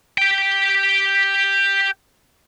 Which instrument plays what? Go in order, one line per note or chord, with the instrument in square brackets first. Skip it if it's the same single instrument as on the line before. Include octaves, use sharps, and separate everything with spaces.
[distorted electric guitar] G4 G5